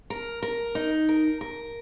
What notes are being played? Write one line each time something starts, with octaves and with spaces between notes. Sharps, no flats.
A#4
A#4
D#4
A#4
A#4